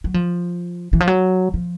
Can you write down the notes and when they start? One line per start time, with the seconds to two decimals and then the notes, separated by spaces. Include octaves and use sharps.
0.04 F#3
0.14 F3
0.93 E3
1.00 F3
1.08 F#3
1.54 F3